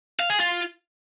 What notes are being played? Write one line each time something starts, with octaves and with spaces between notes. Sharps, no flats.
F5
G#4
F4